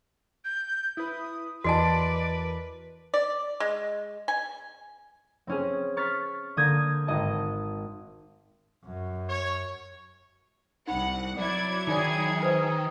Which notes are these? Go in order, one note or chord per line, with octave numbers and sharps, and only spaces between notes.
G6
E4 B4 D#6
E2 E3 F#4 A#4 B4 D5 D#5 A5
D5
G#3
G#5
C4 C#4 G#4
C#6 F6 A6 B6
D3 A#3 D#6 G6 G#6 A#6
G#1 D#5 A5
F#2
C#5
C2 D#4 F#5 B5
F#3 E4 D5 G#6
D#3 D#4 G#4 D5 G#5
B4 C5